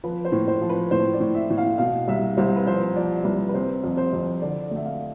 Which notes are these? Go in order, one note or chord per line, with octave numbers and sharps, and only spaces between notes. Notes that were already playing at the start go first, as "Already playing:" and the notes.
F3 B4
C5
A2
C5
F3
B4
A2 C5
D5
A2
E5
A2
F5
B2 F5
C2 E5
C2 C5
B4
F3 C5
F3 D5
C2 B4
B4
C3 C5
F2
C5
F2
D3 D5
D2
E5
F5